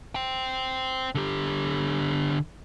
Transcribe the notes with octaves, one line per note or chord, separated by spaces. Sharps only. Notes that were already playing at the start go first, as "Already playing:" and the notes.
C5 G5
D3 G4